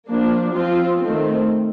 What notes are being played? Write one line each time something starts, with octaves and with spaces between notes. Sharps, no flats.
F3 A#3 D4
F3 C4 F4
D#3 A3 C4